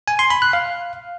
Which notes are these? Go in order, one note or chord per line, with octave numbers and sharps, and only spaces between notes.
G#5
C6
B5
F#6
F5